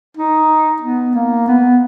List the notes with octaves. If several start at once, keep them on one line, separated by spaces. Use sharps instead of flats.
D#4
B3
A#3
B3